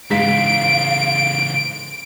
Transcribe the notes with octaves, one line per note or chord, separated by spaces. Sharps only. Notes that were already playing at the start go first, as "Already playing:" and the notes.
G#2 C#3 E3 F5 B6 D7